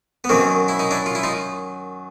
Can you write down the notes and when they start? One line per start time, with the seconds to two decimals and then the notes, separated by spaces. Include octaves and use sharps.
0.24 B3
0.29 F#2 D#3 F#3 A#3 C4
0.68 E4
0.79 D#4
0.91 D4 E4
1.06 F4
1.15 E4
1.23 D#4 F4